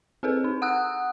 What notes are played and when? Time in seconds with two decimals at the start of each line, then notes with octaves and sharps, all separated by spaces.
0.23 C4 G#4 A4 B4
0.44 D#4
0.62 F#5 D#6 E6 F#6